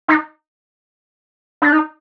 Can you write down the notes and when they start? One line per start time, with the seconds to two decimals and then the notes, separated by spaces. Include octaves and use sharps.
0.08 D#4
1.62 D4
1.72 D#4